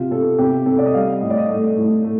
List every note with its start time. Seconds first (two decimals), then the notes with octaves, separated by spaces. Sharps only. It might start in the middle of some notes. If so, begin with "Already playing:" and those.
Already playing: C3 F4
0.11 C3 A4
0.39 C3 G4
0.66 C3 A4
0.79 D5
0.86 D#5
0.94 G3 F5
1.21 A2 D#5
1.30 D5
1.38 D#5
1.49 A3
1.77 A2
2.04 A3